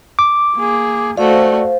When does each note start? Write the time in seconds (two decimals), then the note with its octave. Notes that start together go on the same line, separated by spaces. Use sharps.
0.19 D6
0.56 A#3 G#4
1.17 A3 F#4 C5 D5 F5